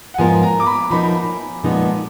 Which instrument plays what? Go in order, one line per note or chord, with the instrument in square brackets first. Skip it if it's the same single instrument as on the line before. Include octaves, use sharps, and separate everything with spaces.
[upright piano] F#5
[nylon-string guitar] G#2 F3 B3 F4 A#4 [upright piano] G#5
[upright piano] A#5
D6
B5
[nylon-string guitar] F3 B3 D#4 A#4 [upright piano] B5
[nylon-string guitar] A#2 F3 G#3 B3 D#4